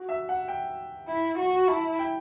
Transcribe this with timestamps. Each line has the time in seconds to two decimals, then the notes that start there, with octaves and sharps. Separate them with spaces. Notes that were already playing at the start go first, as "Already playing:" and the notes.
Already playing: F#4
0.09 E5
0.29 F#5
0.48 G5
1.09 E4
1.39 F#4
1.68 E4 A5
1.99 G5